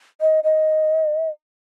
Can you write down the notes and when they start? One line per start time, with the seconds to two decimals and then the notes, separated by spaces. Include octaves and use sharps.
0.21 D#5
0.44 D#5